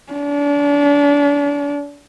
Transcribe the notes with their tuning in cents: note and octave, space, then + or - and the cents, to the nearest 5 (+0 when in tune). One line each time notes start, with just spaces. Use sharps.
D4 -35